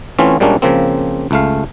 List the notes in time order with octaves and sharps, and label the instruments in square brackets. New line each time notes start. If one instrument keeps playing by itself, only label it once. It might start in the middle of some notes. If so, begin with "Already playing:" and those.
[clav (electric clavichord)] E3 A3 C4 C#4 F4
A#2 G3 G#3 A#3 C#4 D4
C#3 F3 A#3 C4
C#2 A3 F5